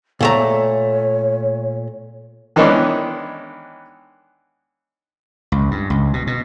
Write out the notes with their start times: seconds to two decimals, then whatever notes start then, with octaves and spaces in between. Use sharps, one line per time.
0.21 A#2 A3 C#5 A#5
2.56 D#3 E3 G#3 B3 C#4 D4
5.52 C#2
5.71 G2
5.90 C#2
6.13 B2
6.27 B2